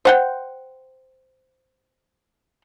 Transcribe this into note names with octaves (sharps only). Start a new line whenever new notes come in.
C5 F#5 G5